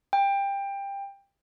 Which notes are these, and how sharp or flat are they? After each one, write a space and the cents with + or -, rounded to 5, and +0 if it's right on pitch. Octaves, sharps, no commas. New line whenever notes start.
G5 +20